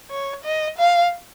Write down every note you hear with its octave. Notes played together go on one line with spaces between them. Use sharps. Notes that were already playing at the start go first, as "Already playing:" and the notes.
C#5
D#5
F5